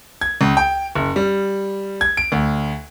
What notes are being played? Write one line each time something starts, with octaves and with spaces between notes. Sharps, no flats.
G#6
C#2
G5
F#1
G3
G#6
D7
D2